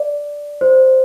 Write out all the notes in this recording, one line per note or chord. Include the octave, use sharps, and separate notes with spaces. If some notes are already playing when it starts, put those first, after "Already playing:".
Already playing: D5
C5